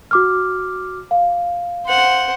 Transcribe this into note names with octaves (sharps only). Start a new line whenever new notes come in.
F#4 D6 F6
F5
C5 F#5